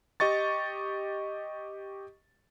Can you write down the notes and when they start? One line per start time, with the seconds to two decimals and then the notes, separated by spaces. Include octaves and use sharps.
0.20 G4 D#5 C#6 A6